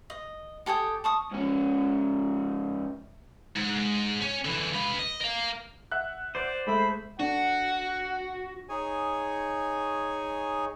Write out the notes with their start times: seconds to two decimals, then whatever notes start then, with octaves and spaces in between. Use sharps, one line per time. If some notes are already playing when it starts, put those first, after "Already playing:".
0.10 D#5
0.66 G4 A4 G#5 D#6
1.04 A5 C#6 D#6
1.31 G#2 C#4
3.56 G#2
4.21 C#4
4.45 D3 E3
4.74 B4 F5
4.99 D#5
5.21 A#4 F5
5.92 E5 F#5 F#6
6.35 C5 D5
6.67 G#3 A3 E5 B5
7.20 D4 F#4 F#5
8.69 D#4 G#4 C#5 G#5